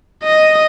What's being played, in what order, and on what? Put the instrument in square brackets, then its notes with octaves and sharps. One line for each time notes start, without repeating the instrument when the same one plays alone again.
[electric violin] D#5